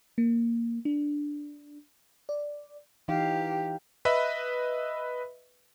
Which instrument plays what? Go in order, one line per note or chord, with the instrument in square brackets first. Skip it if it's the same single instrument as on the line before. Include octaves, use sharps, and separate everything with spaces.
[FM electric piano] A#3
D4
D5
[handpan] E3 D#4 F5 [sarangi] G4
[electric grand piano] B4 D#5 E5 B5